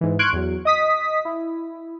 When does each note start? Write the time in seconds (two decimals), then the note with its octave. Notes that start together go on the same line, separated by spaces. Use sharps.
0.01 G#2 E3
0.19 C6 C#6 F6 F#6 G#6 D7
0.33 E2 F#3
0.65 D#5 D#6 B6
1.25 E4